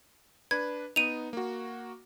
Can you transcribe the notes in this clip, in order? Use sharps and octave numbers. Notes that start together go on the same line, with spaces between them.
D4 B4 G#6
B3 D#4 D#7 F7
A#3 F#4